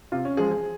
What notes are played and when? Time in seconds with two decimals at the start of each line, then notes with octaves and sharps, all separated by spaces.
0.12 C3 F4
0.25 C#4
0.37 F3 G#3 G#4
0.51 G#4